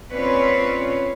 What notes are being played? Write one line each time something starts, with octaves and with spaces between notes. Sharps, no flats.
C4 C#4 F4 B4 C#5 D5